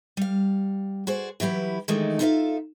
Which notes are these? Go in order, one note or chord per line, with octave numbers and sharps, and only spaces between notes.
G3 F5
F#4 G#4 C5 D5
E3 F#3 E4 G4 B4
D#3 E3 G#3 A3 D4 D#4
D#4 F4 A4 C5 E5 F5